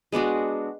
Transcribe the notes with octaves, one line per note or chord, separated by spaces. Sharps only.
G#3 B3 D4 F#4